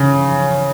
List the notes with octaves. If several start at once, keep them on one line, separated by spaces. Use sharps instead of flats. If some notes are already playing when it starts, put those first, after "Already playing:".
Already playing: C#3